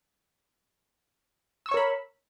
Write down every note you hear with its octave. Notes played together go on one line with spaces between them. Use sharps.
A#4 C#5 B5 C#6 E6